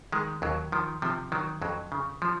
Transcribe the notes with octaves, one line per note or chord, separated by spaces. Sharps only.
D#3 G#3
D#2 F#3
D#3 F3
C3 F3
D#3 F#3
F2 F#3
C#3
F3